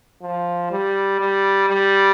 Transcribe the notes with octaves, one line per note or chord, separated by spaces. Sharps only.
F3
G3
G3
G3